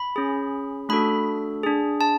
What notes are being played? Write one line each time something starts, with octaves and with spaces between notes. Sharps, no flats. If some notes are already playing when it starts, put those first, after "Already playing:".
Already playing: B5
C#4 G#4
A3 D4 F#4 A4 B5
D4 G#4
A5